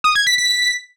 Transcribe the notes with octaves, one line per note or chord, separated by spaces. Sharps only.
D#6
G#6
B6
B6